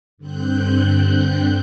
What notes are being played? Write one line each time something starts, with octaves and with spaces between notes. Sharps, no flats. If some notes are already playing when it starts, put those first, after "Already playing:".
G2 D3 C4 F#6 G6